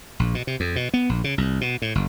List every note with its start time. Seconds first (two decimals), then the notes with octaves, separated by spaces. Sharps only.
0.19 A#1
0.35 B2
0.47 C3
0.60 F2
0.76 B2
0.94 B3
1.09 A#1
1.24 C#3
1.38 C2
1.61 B2
1.82 A2
1.95 F#1